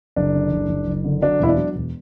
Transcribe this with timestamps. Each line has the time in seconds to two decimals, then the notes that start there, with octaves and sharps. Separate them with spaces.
0.16 F#1 D4
0.34 D3
0.52 F#1
0.69 F#1
0.87 F#1
1.04 D3
1.21 F#3 D4
1.39 E1 E4
1.48 D4
1.57 F#3
1.75 E1